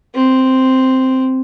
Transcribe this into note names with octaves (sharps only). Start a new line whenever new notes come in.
C4